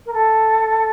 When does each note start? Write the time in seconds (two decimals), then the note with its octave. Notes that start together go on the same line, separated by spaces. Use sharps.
0.06 A#4
0.13 A4